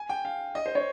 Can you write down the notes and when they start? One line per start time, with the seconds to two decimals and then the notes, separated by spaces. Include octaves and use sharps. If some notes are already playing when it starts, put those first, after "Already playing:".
Already playing: G#5
0.09 G5
0.25 F5
0.55 D#5
0.66 C5
0.75 C#5